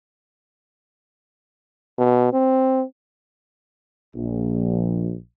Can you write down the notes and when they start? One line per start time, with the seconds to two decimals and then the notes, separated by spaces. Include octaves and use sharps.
1.98 B2
2.33 C4
4.13 A#1